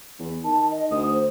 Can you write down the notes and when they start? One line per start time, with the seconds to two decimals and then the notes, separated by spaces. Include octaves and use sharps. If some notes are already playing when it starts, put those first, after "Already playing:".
0.19 E2
0.44 D#3 A5
0.71 D#5
0.91 D2 D#6
1.08 C5